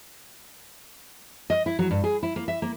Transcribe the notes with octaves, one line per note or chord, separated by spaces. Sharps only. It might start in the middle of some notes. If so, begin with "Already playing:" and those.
D#5
E4
F#3
G2
G#4
E4
A#3
E5
A#3